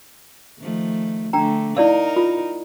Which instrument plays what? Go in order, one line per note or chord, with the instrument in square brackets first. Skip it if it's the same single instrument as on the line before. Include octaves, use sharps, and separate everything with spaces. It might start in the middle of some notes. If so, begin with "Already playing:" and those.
[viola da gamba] D#3 F3 A3
[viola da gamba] D3 A3 [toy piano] D4 G5 A#5
[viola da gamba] D#4 A#4 [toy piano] E4 D5 F5
[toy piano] F4